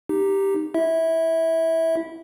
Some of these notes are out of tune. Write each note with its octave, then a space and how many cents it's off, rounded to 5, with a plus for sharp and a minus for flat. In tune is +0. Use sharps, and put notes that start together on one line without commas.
D#4 -5 G4 +0
E4 +0 E5 -20